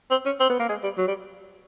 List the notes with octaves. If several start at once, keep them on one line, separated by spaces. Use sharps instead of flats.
C4
C#4
C4
B3
A#3
G#3
G3
F#3
G3